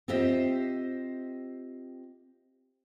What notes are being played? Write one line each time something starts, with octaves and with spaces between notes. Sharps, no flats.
C4 F4 G4 C5 D#5 E5